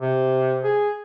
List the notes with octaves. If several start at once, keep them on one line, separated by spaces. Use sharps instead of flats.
C3
G#4